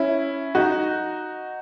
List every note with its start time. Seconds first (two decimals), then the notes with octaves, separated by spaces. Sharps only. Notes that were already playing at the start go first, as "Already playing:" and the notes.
Already playing: C#4 E4
0.55 D#4 F#4